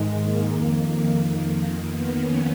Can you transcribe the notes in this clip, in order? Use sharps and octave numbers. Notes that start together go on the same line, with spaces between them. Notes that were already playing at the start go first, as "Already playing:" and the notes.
Already playing: G#2 D#3 G#3
A#3
F2 D#3
A#3
A#3
F2 D#3 A#3
B3
C#4